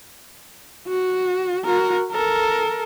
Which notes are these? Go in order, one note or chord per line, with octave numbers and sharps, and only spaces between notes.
F#4
F#4 A#4
A4 A#4